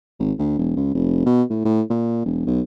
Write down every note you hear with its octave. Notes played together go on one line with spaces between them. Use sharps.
G#1
D2
E1
C#2
F1
B2
A2
A2
A#2
E1
B1